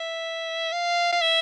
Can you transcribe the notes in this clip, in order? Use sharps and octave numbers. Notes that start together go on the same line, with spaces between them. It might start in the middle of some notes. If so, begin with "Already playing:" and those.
Already playing: E5
F5
F5
E5